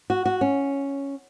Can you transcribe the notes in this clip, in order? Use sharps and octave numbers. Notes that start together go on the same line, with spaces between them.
F#4
F#4
C#4